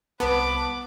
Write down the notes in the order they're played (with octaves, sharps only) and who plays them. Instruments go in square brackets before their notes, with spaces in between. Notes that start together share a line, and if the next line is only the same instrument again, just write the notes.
[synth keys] C2 A5 [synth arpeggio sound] B3 [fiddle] B4 D6